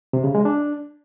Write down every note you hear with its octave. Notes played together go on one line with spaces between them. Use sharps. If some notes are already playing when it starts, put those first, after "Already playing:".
C3
C#3
G#3
D4